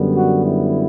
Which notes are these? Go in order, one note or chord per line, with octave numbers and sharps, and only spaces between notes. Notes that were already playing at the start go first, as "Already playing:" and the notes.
Already playing: F#2 D3 G3 B3
F#4
E4